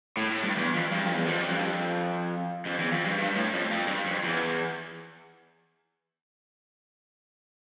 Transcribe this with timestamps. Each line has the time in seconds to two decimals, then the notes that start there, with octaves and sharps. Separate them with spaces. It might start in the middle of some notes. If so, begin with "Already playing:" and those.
0.17 A2
0.30 A2
0.43 G2
0.56 E2
0.74 F2
0.91 G2
1.03 F2
1.14 E2
1.26 F2
1.50 G2
1.61 F2
2.66 F2
2.79 E2
2.93 F2
3.05 G2
3.19 G2
3.35 A2
3.53 F2
3.71 F2
3.88 G2
4.06 F2
4.24 E2